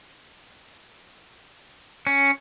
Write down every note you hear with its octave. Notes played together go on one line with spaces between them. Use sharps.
C#4